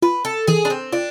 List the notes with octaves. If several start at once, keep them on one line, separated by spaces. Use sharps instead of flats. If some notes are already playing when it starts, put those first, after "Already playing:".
F4 B4
A4
E3 G#4
D4
C4
D4 F4